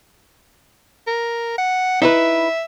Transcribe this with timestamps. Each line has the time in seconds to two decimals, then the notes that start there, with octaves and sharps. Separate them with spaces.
1.07 A#4
1.58 F#5
2.02 D#4 E4 B4 E5